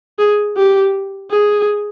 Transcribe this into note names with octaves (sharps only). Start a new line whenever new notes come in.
G#4
G4
G#4